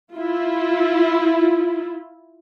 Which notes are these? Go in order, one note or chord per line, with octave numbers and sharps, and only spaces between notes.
E4 F4